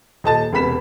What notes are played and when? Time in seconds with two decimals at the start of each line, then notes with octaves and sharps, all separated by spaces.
0.24 D#1 D#5 A5 A6
0.53 E1 C3 B3 B5 B6 E7